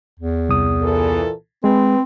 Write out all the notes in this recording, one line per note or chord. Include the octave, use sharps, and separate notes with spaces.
E2
C2 D#6
A#2 E3 A4
G#3 C4 B4